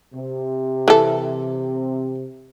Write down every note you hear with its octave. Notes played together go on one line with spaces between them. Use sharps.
C3
E3 A4